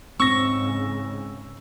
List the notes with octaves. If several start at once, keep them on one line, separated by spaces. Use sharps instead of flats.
G#2 C#3 C4 C#6 E6 A#6